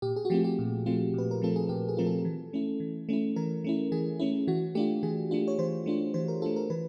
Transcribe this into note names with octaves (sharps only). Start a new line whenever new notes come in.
A#2 G4
G#4
F#4
F3 A3 C4 F4 G4
G4
A#2
F3 A3 C4 F4
A#2 B4
A#4
F3 A3 C4 F4 A4
G#4
A#2 G4
G#4
F3 A3 C4 F4 A#4
A4
E3
A3 C#4 E4
E3
A3 C#4 E4
E3 A#4
A3 C#4 E4
E3 G#4
A3 C#4 E4
E3 F#4
A3 D4 F4 G4
E3 G#4
A3 D4 F4
C#5
E3 C5
A3 D4 F4
E3 C5
A#4
A3 D4 F4 A4
A#4
E3 B4